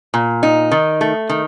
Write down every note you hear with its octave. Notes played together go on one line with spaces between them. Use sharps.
A#2
D#4
D#3
A3
D#3